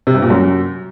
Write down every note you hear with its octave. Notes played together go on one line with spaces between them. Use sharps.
C3
G2
A#2
F#2